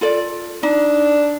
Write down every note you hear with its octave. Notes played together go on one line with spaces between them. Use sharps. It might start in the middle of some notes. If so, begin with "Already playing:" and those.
F4 A4 D5
D4 D#4